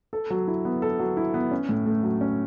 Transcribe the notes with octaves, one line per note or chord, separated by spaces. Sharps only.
A4
F#3
E4
B3
A4
F#3
E4
B3
C#4
A2
A3
F#3
C#4